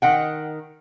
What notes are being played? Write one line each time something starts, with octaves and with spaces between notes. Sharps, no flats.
D#3 F#5 G5